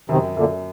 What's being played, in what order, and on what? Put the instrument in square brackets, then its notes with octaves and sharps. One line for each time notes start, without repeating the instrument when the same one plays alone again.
[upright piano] F#2 [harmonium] C3 D#3
[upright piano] F#2 [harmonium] A#2 D3